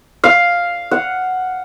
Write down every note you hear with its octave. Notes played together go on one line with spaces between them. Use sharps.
F5
F#5